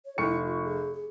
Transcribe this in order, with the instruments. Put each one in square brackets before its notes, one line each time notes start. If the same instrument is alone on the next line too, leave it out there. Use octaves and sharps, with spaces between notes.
[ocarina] C#5
[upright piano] F1 C#6 C#7 [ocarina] E4
[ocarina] F4
G#4
G#4